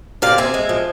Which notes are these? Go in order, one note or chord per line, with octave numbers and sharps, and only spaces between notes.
C3 D5 F5
C4 E5 G#5
G#3
F3